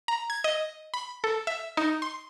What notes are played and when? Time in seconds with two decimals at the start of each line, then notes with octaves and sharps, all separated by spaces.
0.08 A#5
0.30 G#6
0.44 D#5
0.94 B5
1.24 A4
1.47 E5
1.77 D#4
2.02 C6